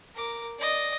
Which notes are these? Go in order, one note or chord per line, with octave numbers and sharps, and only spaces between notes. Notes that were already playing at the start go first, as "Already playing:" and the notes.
A#4 D6
D5 D#5